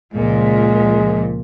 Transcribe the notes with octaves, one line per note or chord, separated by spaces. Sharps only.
C#2 A#2 F3 G#3